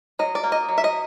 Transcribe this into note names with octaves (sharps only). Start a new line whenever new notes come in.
F#3 D#5
D5
A#3
D#5
F#3
E5
D#5